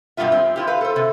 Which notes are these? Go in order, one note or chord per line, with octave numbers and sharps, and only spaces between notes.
G2 B2 D#3 G3 F4 E5
C4
E4 F4 G4
B4 F5
A4 C5
C3